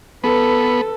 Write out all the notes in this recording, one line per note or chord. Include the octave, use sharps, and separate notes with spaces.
B3 A4 B4